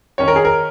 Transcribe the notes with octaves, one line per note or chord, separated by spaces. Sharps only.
D#3 C#4 C#5
A#4
G#4
A#4